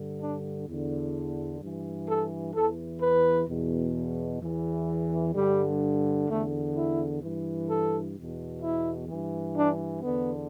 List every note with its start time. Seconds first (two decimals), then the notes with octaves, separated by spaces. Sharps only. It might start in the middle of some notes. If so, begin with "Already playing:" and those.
Already playing: G2 D3
0.20 D4
0.67 E2 D3
1.61 G2 E3
2.08 A4
2.54 E2 E3 A4
3.00 B4
3.48 E2 B2
4.41 E2 E3
5.34 G2 D3 G3
6.28 E2 D3 A3
6.74 E4
7.22 G2 E3
7.68 A4
8.15 E2 B2
8.62 E4
9.08 G2 E3
9.55 D4
10.02 E2 D3 B3